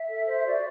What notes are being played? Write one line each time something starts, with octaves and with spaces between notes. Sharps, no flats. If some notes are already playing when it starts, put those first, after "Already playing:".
Already playing: E5
A4
C5
F#4 D5